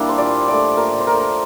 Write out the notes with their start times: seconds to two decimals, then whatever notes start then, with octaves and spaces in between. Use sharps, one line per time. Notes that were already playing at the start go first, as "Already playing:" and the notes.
Already playing: G3 A#3 D4 E4
0.09 C5
0.18 A#2 D5
0.47 F3 A3 D5
0.77 A#2 A#4
1.00 C5
1.07 F3 A3 A#4